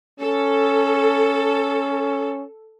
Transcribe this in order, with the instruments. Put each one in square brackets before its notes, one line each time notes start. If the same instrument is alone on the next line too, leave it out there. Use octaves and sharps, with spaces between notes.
[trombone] C#4 [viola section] A4